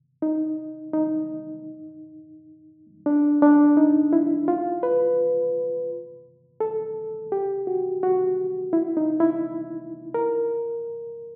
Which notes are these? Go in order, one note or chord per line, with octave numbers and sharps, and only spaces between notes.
D#4
D#4
D4
D4
D#4
E4
F4
B4
A4
G4
F#4
F#4
E4
D#4
E4
A#4